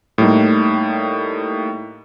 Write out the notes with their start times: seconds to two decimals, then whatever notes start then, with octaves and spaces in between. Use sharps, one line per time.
0.18 A2 G3 A#3 D#4